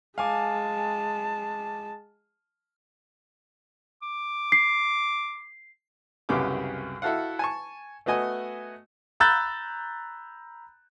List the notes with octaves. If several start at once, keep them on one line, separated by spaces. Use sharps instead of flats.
G#3 F5 G#5 A5 D6
D6
C7
C2 F#2 C#3 B3 G4 D6
E4 F#4 A4 F5 F#5
G#5 A5 C#6
A3 B3 F#4 D#5 G#5
A#5 B5 E6 F#6 G6 A6